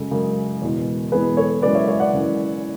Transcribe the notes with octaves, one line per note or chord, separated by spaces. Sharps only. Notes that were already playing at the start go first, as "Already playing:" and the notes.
Already playing: F#2 C#3 G#3 A4
F#2 C#3 G#3
E2 B2 G#3
E2 B2 G#3 G#4 B4
A4 C#5
F#2 C#3 E3 G#3 B4 D5
C#5 E5
C#5 E5
D5 F#5
F#2 C#3 E3 G#3